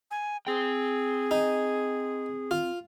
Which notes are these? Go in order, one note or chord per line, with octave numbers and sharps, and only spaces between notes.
G#5
C4 G#4 G5
D#4
F4